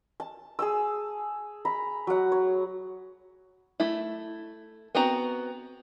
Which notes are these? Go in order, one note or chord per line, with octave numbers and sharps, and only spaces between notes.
A5
G#4 A5 E6
A#5 B5
F#3 F#5
C#5
A3 E4
B3 C4 F#4 A#5